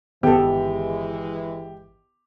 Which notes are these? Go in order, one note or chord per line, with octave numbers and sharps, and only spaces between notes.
G1 D#3 E3 G#3 B3 G4 A4